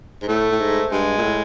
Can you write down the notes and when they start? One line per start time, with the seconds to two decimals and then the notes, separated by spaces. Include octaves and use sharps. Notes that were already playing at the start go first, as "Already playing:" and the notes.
0.22 G#2
0.28 A2 A3
0.52 A2
0.59 G#2
0.91 G2 G#3
1.18 A#2
1.23 A2